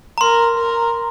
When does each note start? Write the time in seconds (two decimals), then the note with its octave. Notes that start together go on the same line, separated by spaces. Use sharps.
0.18 A#5
0.21 A#4 C6
0.58 A#4